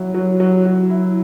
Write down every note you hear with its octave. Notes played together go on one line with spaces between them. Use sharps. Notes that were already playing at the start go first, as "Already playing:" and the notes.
Already playing: F#3 E4
F#3
F#3
F#3
E4